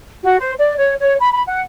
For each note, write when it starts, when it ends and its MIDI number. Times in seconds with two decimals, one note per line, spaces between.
0.23 0.37 66
0.39 0.51 72
0.58 0.75 74
0.78 0.94 73
1.00 1.15 73
1.19 1.28 83
1.33 1.43 83
1.47 1.59 78